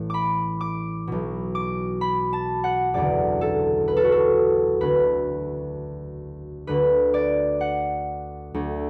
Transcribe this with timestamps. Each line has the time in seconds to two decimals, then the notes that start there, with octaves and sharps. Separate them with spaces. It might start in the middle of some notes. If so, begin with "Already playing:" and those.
Already playing: A1 A2 E3
0.10 B5 D6
0.61 D6
1.07 B1 B2
1.55 D6
2.01 B5
2.33 A5
2.64 F#5
2.94 F#1 E2 D3 D5
3.41 A4
3.88 B4
3.97 A4
4.04 F#4
4.12 A4
4.81 D2 D3 B4
6.67 D2 D3 B4
7.14 D5
7.61 F#5
8.54 D2 D3